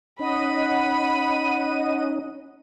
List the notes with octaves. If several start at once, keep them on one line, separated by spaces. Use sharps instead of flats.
C#4 D#4 D#5 F#5 B5 D#7